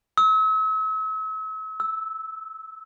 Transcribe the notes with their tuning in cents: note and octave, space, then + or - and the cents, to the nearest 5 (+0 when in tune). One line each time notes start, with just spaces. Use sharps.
E6 -40
E6 -10